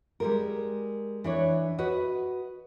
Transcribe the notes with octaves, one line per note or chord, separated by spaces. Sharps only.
G3 G#3 A#4
E3 D4 C#5
F#4 B4 D#5